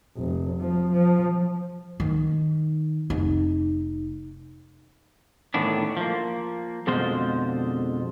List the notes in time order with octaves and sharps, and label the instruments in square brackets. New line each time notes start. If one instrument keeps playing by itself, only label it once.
[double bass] F1
F3
F3
[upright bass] D#3
F1 D#4
[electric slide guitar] A2 D#3 E3 B3 D4
F3 A#3
F2 B2 D3 G#3 F4 C5